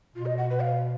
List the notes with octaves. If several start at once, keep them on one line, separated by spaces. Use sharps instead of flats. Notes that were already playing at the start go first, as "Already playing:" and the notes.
B2 F4
D#5
F#5
B4
F5